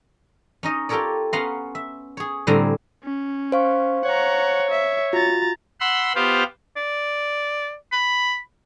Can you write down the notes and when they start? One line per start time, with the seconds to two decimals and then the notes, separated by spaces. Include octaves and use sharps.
0.63 C#4 D#4 D#5
0.89 F4 G4 A4 A#4 C#5 D5
1.33 B3 C#4 F5 F#5 A#5 C6
1.75 E5
2.17 G#4 C#5
2.47 A2 D3 G3 C4 G#5 A#5
3.03 C#4
3.52 C5 F5 C#6
4.05 C#5 F#5 A#5
4.71 E5
5.13 F4 F#4 A#5 A6
5.80 F#5 B5 C6 E6
6.15 B3 F4 G4 C5 F5
6.76 D5
7.92 B5